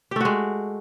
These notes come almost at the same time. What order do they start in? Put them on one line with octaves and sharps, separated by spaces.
G4 A3 F#4 G#3